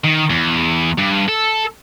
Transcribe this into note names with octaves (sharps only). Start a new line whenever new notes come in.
D#3
E2
G2
A4